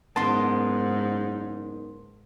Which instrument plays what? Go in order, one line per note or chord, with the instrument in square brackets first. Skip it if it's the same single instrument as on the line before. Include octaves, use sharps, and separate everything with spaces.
[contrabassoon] F#1 [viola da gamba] G#2 [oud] D#3 B3 [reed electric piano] A5 C6